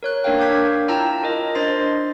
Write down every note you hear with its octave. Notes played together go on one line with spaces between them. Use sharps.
A#4 C#5 F#6
A#3 D4 A#4 C#5 F5 G5
F5 D6 G6 G#6 B6
E4 F4 G5 A5 A#5 E6
F4 A#4 D#5
D4 C5 D#5 C6 A6 C7